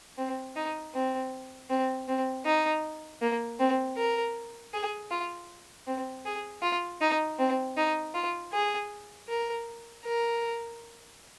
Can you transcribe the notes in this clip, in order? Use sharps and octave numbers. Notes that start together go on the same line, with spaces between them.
C4
D#4
C4
C4
C4
D#4
A#3
C4
A#4
G#4
F4
C4
G#4
F4
D#4
C4
D#4
F4
G#4
A#4
A#4